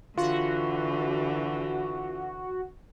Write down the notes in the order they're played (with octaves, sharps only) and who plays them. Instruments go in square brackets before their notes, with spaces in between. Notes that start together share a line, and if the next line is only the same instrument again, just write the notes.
[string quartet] D3 E3 [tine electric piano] F4 [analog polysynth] F#4